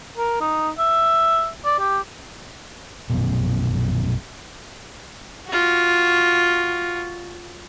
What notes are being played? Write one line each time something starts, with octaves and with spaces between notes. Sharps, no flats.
A#4
D#4
E5
D5
G4
A#1 F#2 B2
F4 F#4